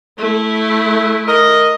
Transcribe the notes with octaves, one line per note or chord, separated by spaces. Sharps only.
A3 E4
A#4 D#5